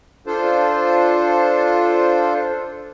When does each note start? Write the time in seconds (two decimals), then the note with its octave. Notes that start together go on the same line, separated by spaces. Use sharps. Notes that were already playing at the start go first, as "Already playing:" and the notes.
0.26 D4 F4 A4 C5